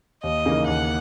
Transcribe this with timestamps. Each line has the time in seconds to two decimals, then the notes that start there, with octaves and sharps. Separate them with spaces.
0.23 D#2 D#5
0.45 C#3 E3 A#3 D#4
0.67 D#2 F#5